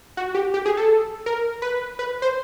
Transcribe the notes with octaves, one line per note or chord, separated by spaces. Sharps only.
F#4
G4
G4
G#4
A4
A#4
B4
B4
C5